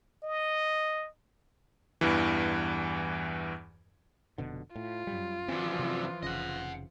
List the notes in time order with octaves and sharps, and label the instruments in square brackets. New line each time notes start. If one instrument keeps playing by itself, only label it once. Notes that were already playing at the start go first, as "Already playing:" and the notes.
[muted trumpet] D#5
[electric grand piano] E2 G2 E3
[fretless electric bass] F1 B2 D3
[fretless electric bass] A2 [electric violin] F4
[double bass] F#2 [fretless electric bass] G3
[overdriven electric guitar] F#2 D3 [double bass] E3 F3 [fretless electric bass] C4
[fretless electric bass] C3 C4
[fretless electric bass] F1 C#3 [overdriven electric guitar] D#5 F#5